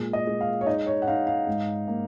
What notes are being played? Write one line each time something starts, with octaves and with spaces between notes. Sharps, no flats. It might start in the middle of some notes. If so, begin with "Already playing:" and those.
Already playing: A#2 G#3
D#5
G#3
F5
C#5
D#4 D#5
C#5
F#5
D#4 F5
F5
G#2
A#3